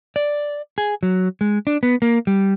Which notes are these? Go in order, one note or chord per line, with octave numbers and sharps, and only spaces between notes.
D5
G#4
F#3
G#3
D4
B3
A#3
G3